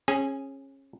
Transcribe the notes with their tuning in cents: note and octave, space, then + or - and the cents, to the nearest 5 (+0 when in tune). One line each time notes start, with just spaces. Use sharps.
C#4 -25 G#4 +0 G#5 +0